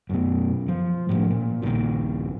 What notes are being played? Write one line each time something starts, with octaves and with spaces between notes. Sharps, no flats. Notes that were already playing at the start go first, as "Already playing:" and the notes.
F#2 B2
F3
A2 D#3 F3
A#2
A#1 D#2 A#2 D#3